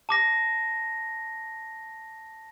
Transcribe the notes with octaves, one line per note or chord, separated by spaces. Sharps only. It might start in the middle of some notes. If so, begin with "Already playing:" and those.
A5 D6 A#6